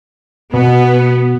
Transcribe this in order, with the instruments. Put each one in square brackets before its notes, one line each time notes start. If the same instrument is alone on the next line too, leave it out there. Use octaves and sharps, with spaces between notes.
[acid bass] B2 [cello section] B3